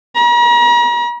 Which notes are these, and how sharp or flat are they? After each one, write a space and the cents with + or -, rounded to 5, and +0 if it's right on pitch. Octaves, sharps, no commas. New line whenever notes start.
A#5 +40